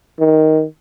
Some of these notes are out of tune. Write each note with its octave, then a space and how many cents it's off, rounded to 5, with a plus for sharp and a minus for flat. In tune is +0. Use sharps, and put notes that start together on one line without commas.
D#3 +10